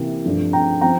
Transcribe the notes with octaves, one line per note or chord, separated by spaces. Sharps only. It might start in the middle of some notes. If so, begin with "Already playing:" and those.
Already playing: C3 E3 A#3
G2 F3 A3
G5 A#5
F3 C4 G5 A#5